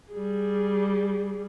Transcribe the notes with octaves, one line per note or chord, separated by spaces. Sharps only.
G3 G#4